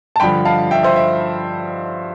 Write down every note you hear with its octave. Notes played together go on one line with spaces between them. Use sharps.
A5
G2 D3 F3 G5 B5
F5 A5
E5 G5
C5 E5
E5